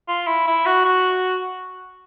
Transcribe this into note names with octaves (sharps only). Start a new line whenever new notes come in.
F4
E4
E4
F#4
F#4